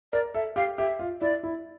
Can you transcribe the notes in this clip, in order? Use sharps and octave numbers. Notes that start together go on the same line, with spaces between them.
A#4 D5
A4 E5
G4 F5
G4 E5
F4
E4 D5
E4